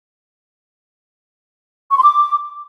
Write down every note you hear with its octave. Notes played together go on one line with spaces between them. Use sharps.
C#6
C6
D6